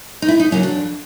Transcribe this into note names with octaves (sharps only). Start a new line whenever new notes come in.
D#4
F2 E4
D#4
C#3 F#3 A#3 C#4
D4
F2